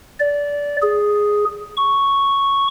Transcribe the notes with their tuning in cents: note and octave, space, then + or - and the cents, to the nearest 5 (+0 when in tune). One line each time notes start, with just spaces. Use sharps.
D5 -20
G#4 +0
C#6 +0